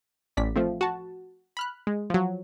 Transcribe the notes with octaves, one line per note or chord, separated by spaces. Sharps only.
A1 D5 B6
F3 A3 C4
F#4 A5
B5 F6 F#6
G#3
F3 F#3